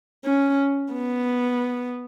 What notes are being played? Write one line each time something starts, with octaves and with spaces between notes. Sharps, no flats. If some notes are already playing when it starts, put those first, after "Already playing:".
C#4
B3